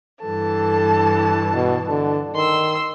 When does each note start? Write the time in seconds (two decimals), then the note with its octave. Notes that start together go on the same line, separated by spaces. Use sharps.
0.22 G2 E3 A4 A5
1.54 B2
1.89 D3
2.34 D#3 C6 E6